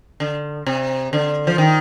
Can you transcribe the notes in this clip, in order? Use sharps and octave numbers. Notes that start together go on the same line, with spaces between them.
D3
C3
D3
F3
D#3